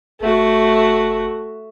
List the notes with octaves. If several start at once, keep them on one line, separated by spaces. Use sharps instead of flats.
F1 A3 F#4